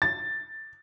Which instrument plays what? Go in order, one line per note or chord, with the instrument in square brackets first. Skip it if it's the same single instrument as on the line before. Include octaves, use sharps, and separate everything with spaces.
[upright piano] A6